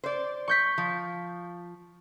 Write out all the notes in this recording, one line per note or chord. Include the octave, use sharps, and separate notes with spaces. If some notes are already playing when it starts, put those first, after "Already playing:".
C5 D5
C#6 G6 B6
F3